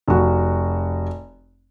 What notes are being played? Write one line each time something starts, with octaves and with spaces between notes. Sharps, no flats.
F1 F#4